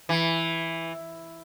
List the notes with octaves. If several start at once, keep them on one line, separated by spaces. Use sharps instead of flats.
E3